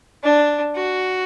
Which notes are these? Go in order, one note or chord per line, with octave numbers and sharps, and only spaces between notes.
D4
F#4